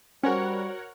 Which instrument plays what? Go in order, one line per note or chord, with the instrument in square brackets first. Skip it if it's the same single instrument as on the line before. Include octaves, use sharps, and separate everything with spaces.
[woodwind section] G3 [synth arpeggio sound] C#4 [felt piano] F#4 C5 [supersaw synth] A#4 C#5 F#5